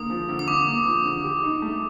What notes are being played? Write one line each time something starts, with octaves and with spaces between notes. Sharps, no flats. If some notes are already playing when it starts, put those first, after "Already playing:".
Already playing: D3 A#3 D#6
F3
D3
D#6
D3 D6
A#3
F3
D3
G4
D#4
A3